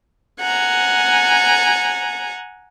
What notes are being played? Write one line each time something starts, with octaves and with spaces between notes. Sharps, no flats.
F#5 G#5 A#5